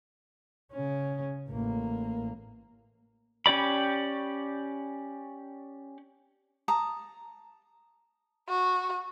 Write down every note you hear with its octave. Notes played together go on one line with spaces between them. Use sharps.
C#3 C#4
A1 A#3
C#4 G4 D5 B5
A5 A#5 D#6
F#4